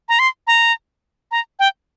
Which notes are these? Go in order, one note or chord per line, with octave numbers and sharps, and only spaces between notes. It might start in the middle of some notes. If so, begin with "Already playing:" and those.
A#5
C6
A#5
A#5
G5